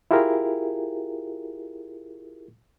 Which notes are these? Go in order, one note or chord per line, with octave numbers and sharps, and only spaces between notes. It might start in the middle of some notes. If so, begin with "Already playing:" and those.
E4 F4 G4 G#4 A#4